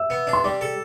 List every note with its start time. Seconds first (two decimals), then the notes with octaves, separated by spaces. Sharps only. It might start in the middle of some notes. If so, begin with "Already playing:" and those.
Already playing: E5 E6
0.10 B3
0.27 D4
0.33 C6
0.44 G3 D5 D6
0.61 A4